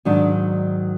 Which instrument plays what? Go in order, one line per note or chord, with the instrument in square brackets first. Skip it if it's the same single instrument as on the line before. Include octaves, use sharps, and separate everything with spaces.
[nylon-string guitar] G#2 D#3 F#3 D4